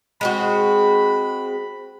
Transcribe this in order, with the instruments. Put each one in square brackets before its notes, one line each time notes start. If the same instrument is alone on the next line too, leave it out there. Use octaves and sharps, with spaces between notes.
[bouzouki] G#3 C4 F#4 [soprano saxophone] B5